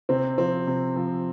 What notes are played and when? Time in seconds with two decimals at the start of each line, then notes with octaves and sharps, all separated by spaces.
0.09 C3 C4
0.38 F3 C4
0.67 C3
0.96 F3